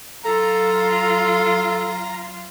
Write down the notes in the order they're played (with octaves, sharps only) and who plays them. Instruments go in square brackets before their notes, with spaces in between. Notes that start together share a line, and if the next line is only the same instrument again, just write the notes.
[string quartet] F#3 F4 [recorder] A4 [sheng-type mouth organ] A#5